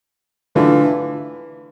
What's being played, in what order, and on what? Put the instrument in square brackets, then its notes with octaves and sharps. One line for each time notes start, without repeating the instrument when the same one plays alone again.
[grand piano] D3 A3 D4 F4 [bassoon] E3